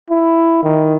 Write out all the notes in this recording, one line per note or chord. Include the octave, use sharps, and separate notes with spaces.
E4
D#3